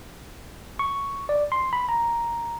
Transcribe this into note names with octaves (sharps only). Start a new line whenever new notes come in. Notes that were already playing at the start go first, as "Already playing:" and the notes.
C#6
D5
C6
B5
A#5